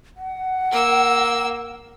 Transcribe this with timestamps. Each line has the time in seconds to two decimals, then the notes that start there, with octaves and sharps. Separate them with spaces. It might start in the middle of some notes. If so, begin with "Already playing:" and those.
0.17 F#5
0.71 A#3 E6